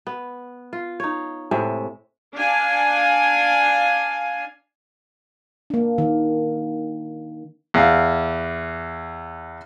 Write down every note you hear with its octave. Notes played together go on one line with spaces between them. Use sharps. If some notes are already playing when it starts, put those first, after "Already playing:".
B3
F4
D#4 C#5
A2 C3 G#3 E5
D4 F5 G#5
A#3 D4
D#3
E2 F5